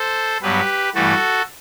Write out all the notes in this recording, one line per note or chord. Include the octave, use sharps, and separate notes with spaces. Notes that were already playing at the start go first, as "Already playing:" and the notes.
Already playing: A4 C5
G2 F#3 B3 G4 B4
G2 E3 A3 F#4 A4